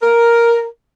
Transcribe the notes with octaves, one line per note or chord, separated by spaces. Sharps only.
A#4